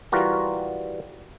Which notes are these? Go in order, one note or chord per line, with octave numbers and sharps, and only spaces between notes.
E3 G3 F4 F#4 A#4